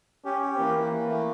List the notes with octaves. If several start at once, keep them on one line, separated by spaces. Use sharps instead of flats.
C#4 G4
G4
E3 A#3
E3
E3
A3